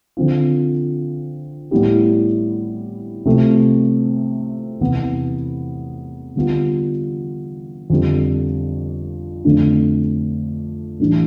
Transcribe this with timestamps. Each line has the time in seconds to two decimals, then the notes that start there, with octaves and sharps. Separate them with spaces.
0.17 D3 F3 C4 F4
1.71 A2 G3 B3 E4 G4
3.25 C3 F3 A3 C4
4.81 E2 C3 E3 B3
6.36 D3 G3 B3 F4
7.90 F2 D3 G3
9.44 F2 D3 F3 A3 D4
11.00 A2 E3 G3 D4